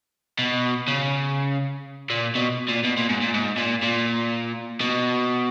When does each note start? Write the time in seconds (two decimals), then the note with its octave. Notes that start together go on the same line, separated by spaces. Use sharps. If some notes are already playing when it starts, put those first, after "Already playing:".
0.39 B2
0.88 C#3
2.10 A#2
2.35 B2
2.68 A#2
2.84 B2
2.97 A#2
3.09 G#2
3.21 A#2
3.34 G#2
3.57 A#2
3.83 A#2
4.80 B2